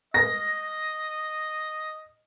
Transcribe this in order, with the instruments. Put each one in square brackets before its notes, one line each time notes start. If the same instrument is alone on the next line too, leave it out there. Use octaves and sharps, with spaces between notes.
[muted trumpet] D#5 [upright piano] A#6